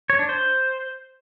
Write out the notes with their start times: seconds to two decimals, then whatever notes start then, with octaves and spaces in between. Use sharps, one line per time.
0.10 C#5
0.19 D4
0.29 C5